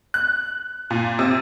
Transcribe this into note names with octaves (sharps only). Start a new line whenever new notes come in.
F#6
A#2
C3